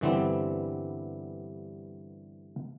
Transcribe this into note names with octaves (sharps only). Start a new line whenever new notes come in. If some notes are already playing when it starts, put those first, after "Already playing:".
G2 D3 E3 G3 B3 C4